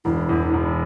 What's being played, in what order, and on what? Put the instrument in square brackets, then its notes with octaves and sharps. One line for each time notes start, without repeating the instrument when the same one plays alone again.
[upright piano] E1 [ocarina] E4
[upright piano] E2
E1